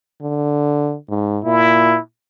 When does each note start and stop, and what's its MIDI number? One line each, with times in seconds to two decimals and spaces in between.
0.22 0.95 50
1.09 1.39 44
1.44 1.96 46
1.44 1.99 64